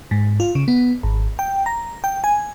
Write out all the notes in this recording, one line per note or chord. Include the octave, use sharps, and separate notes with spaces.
G#2
F4
C#3
B3
G#1
G5
A#5
G5
G#5